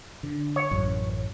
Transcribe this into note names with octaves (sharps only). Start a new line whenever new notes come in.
D3
C#5
A1 F#2